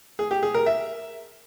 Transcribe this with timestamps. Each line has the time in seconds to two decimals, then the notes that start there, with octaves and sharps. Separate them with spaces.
0.19 G#4
0.31 G4
0.43 G#4
0.54 A#4
0.66 E5